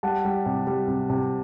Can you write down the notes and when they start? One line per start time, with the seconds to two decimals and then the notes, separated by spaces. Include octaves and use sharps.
0.03 G3 F#5 A5
0.25 G3
0.46 C3
0.67 G3
0.88 C3
1.10 C3